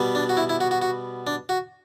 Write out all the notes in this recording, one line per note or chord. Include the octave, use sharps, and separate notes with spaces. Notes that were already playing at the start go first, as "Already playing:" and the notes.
Already playing: B2 G3 B3
D4
F#4
E4
E4
F#4
F#4
F#4
D4
F#4